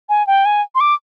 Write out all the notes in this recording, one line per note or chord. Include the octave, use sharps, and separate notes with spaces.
G#5
G5
G#5
C6
D6